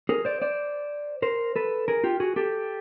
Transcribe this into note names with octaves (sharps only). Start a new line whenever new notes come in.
G#4 A#4
C5 D5
C5 D5
A#4 C5
A4 B4
G#4 A#4
F4 G4
F#4 G#4
G4 A4